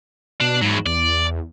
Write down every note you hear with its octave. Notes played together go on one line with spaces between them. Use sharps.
B2 D4
E2 G#2 F#3
E2 D5